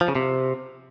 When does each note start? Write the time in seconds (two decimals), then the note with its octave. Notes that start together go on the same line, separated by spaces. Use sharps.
0.01 F3
0.08 C#3
0.15 C3